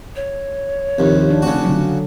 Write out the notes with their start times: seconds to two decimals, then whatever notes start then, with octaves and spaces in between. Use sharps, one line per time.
0.16 C#5
0.99 A#1 D#2 C3
1.30 D4
1.42 F1 C#3 F#4
1.65 D3 F#3